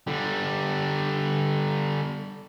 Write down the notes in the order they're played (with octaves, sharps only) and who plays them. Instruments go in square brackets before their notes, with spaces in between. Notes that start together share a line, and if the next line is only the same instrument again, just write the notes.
[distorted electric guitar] D3 G3